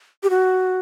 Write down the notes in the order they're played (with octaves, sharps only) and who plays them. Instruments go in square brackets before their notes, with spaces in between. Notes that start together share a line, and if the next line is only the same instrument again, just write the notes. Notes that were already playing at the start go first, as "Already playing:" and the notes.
[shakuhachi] G4
F#4